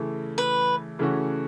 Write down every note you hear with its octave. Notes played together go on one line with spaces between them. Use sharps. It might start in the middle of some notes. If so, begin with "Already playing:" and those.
Already playing: C#3 E3 A3
B4
C#3 E3 A3 C#4 F#4